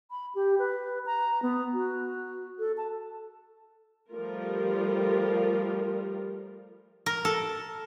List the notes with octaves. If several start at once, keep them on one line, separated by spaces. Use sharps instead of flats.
B5
G4
B4
A#5
B3
F#4
A4
A5
F3 G3 A3 F4 A#4
A#4
A4